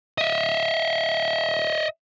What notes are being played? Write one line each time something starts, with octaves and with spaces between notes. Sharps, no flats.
D#5 E5